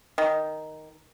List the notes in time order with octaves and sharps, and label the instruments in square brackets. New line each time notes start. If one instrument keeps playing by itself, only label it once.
[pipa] D#3